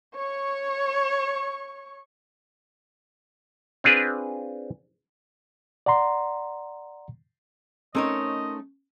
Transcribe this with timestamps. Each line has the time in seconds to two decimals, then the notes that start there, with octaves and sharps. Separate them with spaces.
0.16 C#5 C#6
3.84 C4 D4 F4 G#4 B4
5.86 D5 F#5 A#5 C6
7.95 A3 C4 C#4 D#4 A#4 C#5 D#5